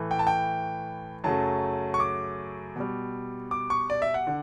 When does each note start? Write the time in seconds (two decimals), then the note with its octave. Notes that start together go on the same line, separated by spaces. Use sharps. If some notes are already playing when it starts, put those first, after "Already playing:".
Already playing: A2 E3 A3
0.11 G5
0.19 A5
0.27 G5
1.24 F#2 C#3 F#3 A3 A5
1.94 C#6
2.00 D6
2.76 B2 G3
3.51 D6
3.70 C#6
3.90 D5
4.02 E5
4.14 F#5
4.27 D3